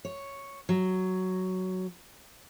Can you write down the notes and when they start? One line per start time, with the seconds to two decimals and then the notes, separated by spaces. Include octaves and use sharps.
0.05 C#5
0.69 F#3